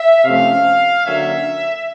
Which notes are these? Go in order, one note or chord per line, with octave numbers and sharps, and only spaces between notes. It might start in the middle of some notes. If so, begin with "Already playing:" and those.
Already playing: E5
C3 F3 A3 C#4 F5
D3 F#3 A#3 C#4 E5